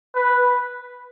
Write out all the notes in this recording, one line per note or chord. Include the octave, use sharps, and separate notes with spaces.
B4